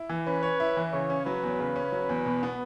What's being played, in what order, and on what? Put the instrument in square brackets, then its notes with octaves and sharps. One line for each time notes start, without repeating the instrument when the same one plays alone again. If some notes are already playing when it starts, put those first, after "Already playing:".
Already playing: [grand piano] E4
E3
[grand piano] C#4 [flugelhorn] B4
[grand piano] C#5
E4
E3
[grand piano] C#3 [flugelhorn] C#5
[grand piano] C#4
[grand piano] F#3 [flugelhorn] B4
[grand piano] E2
C#3
C#4
F#3
E2
B2
B3